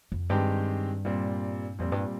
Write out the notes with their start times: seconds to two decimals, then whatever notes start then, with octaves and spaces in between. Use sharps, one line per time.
0.12 F2
0.29 G2 D#3 G#3 C4 G4
1.05 A#2 G3 C4
1.79 F2 A#2 G3 C4
1.92 G2